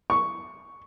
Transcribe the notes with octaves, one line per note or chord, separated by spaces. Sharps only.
C#6